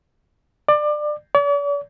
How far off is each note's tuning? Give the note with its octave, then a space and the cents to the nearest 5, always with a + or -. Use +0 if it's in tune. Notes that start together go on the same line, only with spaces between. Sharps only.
D5 +25
D5 -45